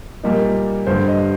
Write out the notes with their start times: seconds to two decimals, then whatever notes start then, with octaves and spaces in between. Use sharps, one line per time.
0.23 A#2 G3 A#3 D#4
0.87 G2 D3 G3 C5
1.08 D#5